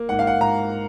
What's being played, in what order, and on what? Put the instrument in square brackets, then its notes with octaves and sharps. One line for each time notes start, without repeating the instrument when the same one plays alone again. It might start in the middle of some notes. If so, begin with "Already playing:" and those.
Already playing: [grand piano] A#3
G#2 F#5
F5
F#5
G#2 A#5